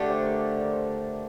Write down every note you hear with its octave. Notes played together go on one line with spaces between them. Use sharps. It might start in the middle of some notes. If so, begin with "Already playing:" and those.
Already playing: D3 A3 D4 G4 D5
C5
A#4
D5
C5
A#4
C5